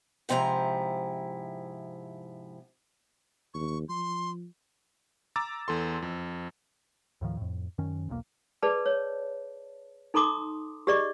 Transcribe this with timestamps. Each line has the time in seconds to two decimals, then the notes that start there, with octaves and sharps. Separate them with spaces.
0.29 G#2 C3 F3 E4 A#5
3.54 D#2 C#6
3.89 F3 C6
5.36 A#5 D6 E6 A6
5.68 E2 A4 C6
6.02 F2
7.21 D#2 A2 D#3 F3
7.37 F2 A2
7.78 F#2 D#3 C#4
8.09 E1 B1 C3 A#3
8.62 G#4 B4 D5 A5
8.86 C#5
10.14 D#4 A4 A#5 C6 D6 D#6
10.87 G4 G#4 D5 D#5 C#6